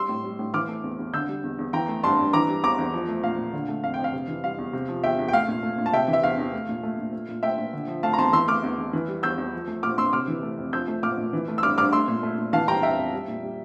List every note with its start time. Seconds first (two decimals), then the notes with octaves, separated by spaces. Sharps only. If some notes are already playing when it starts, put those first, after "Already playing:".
Already playing: G3 C6 E6
0.09 A2
0.24 G3
0.39 A2
0.54 E3 D6 F6
0.69 A3
0.84 E2
0.99 E2
1.13 D3 E6 G6
1.29 G3
1.44 E2
1.59 E2
1.73 E3 G5 A#5
1.89 A3
2.03 G2 A5 C6
2.19 G2
2.33 E3 A#5 D6
2.48 G3
2.64 E2 A#5 D6
2.78 E2
2.93 F3
3.08 A3
3.23 A#2 F5
3.38 A#2
3.54 D3
3.68 A3
3.83 F2 F5
3.94 G5
3.99 F2
4.04 F5
4.13 C3
4.28 E3
4.44 G3 F5
4.58 E2
4.73 C3
4.88 F3
5.03 E2 E5 G5
5.19 E2
5.28 G5
5.33 A3 F5
5.48 A#2
5.63 A3
5.78 A#2
5.86 A5
5.93 C3 E5 G5
6.08 E3
6.13 E5
6.23 E2 F5
6.38 E2
6.53 A3
6.69 A#2
6.83 A3
6.98 A#2
7.13 A3
7.28 A#2
7.43 A3 E5 G5
7.58 A#2
7.73 D3
7.88 F3
8.03 A3 F5 A5
8.14 A#5
8.18 E2 A5 C6
8.33 E3 C6 E6
8.48 A3 D6 F6
8.64 E2
8.78 E2
8.93 E3
9.08 G3
9.23 E2 E6 G6
9.38 E2
9.53 F3
9.68 A3
9.83 A#2 D6 F6
9.98 A#2 C6 E6
10.13 C3 D6 F6
10.28 E3
10.43 A3
10.57 F2
10.73 F3 E6 G6
10.88 A3
11.03 A#2 D6 F6
11.18 A#2
11.33 E3
11.48 A3
11.58 E6
11.63 G2 D6 F6
11.78 G2 D6 F6
11.93 A3 C6 E6
12.08 A#2
12.23 A3
12.38 A#2
12.53 E3 F5 A5
12.68 G3 G5 A#5
12.83 F2 E5 G5
12.98 F2
13.13 G3
13.28 A#2
13.43 G3